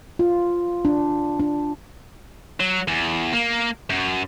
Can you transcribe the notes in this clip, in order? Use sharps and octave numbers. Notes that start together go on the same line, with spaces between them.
F4
D4
D4
F#3
E2
A#3
F#2